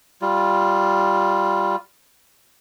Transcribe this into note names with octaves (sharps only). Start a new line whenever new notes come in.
G3 F4